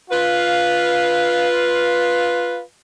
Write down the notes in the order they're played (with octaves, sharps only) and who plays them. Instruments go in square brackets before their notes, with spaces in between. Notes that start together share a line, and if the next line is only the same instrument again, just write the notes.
[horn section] F4 B4 F5